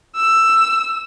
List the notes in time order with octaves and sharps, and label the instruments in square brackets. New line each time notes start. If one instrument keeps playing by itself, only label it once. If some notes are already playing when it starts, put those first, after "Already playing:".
[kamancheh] E6